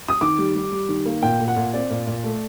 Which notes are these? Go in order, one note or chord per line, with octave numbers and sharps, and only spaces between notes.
D#6
D#3 D6
G3
G3
G3
D#3
A#3
A#2 G5
A#2
F#5
A#2
C4 D5
A#2
A#2
A3